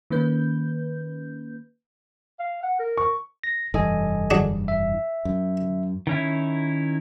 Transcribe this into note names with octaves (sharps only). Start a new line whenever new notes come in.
D#3 A#3 C#4 B4 G6
F5
F#5
A#4
C#6
A#6
F1 G2 E3 A4 D#5 G#5
F#3 D4 G#4
E5
F#2
D#3 C#4 E4